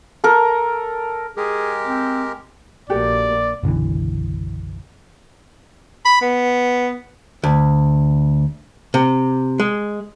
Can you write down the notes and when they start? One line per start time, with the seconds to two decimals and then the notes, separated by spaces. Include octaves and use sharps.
0.24 A4 A#4
1.37 G#3 G4 G#4 A#4
1.87 C4
2.90 A#1 A#3 F#4 G4 A4 D5
3.63 F#1 B1 D3 E3
6.05 B5
6.21 B3
7.43 D2
8.94 C3
9.60 G#3